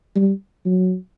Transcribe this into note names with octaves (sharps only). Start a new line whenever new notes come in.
G3
F#3